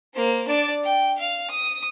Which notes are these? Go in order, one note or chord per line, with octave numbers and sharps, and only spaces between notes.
A#3 C5
D4 D5
G5
F5
D#6